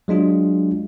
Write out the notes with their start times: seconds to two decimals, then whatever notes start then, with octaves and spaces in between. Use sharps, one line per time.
0.08 F#3 G#3 D4 F4